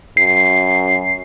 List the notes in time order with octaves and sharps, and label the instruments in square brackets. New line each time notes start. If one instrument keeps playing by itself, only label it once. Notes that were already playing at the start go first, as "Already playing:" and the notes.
[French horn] F#2 [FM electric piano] C7